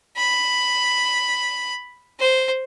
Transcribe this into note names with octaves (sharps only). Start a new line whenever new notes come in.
B5
C5